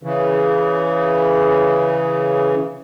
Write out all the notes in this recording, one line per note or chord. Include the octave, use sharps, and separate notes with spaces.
C#3 E3